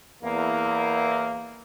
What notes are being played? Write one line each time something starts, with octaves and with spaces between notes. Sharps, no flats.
E2 A#3